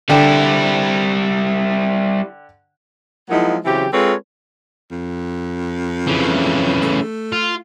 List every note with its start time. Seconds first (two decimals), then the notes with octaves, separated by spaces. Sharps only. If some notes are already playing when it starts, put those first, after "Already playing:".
0.09 D3 G3 E4 G5
3.30 F3 F#3 G#3 A#3 D#4 E4
3.65 C#3 E3 F#3 C4 G4
3.93 G#3 C4 F4 A4 B4 C#5
4.91 F2
6.07 C#3 E3
6.82 A3
7.32 F4